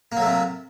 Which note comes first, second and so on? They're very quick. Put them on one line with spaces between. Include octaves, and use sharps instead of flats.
A#3 F#3 A3 C3